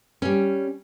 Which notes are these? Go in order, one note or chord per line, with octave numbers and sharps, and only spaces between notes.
G3 C#4